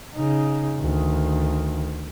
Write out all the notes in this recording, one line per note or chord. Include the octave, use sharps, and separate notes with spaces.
C#3 D#4
D2 D#3